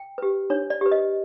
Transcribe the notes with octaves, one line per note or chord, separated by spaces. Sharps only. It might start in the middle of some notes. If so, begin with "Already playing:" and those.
Already playing: G5
G4 B4
D4 C#5
D5
G4 B4
D#5